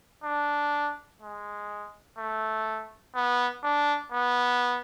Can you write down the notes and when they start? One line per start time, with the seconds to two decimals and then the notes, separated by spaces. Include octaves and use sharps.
0.24 D4
1.22 G#3
2.18 A3
3.15 B3
3.64 D4
4.12 B3